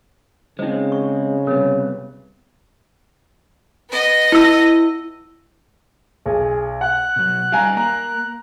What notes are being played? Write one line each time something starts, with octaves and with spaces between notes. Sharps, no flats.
C#3 G#3 C4 D#4 C5
C#6
C3 G3 B3 A#4 C#5
B3 D#5
E4 E6
B1 G#4
F#5 F#6
B2 F#3
G3 D#4 G4 F5 G#5 A#5
A#3 A#5 F#6